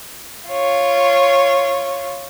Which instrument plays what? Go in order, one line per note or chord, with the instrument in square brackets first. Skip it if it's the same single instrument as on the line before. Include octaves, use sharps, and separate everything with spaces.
[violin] F4 C#5